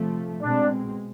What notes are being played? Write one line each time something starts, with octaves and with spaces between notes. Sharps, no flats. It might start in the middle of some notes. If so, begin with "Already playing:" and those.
Already playing: C3 F3 A3
B2 G#3 C4 D4